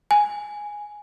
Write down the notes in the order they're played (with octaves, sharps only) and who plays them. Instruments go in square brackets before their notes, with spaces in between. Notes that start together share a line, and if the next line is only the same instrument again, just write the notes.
[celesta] G#5